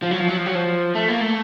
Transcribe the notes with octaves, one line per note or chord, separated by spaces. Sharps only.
F3
F#3
F3
F#3
F3
F#3
F3
A3
A#3
A3